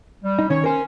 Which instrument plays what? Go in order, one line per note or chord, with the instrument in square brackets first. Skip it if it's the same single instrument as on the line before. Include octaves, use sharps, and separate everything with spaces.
[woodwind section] G3
[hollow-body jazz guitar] D#4
[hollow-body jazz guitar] D#3 C#4 [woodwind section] C#5
[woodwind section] C#4 [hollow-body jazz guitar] A#4 C5